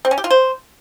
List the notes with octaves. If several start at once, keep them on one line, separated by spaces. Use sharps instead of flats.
C4
C#4
G4
F4
C5